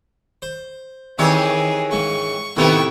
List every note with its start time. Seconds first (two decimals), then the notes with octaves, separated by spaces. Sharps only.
0.42 C5
1.19 D#3 E3 C4 G4 G#4 C#5
1.91 G#2 C#3 C#6
2.56 A2 C3 D#3 B3 E4 G5 C#6